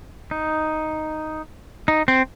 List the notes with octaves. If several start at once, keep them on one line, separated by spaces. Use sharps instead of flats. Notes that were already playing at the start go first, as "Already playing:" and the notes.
D#4
D#4
C4